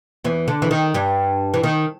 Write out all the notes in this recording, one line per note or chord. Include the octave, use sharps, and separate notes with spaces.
E2 E3
D3
E3
D#3
G2 G3
E3
D#3